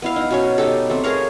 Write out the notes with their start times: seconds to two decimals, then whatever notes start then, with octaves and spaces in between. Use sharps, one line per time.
0.02 B3 E4 F5
0.16 D#4
0.31 B2 C#4 C#5
0.58 B2 D#4 G4 A4
0.90 A3 C4
1.04 G#4 A#4 C#5 F5